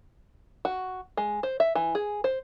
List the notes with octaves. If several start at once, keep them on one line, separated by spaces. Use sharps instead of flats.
F#4
G#3
C5
E5
E3
G#4
C5